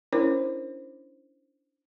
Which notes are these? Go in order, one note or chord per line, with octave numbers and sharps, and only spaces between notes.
C#4 D4 E4 A#4 C5 C#5